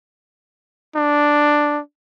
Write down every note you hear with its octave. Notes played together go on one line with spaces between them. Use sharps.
D4